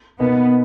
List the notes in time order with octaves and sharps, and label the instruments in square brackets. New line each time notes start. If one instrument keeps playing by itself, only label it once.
[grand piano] B2 A#3 D#4 [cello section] B3